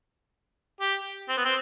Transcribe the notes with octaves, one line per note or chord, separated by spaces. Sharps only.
G4
C4
B3
C4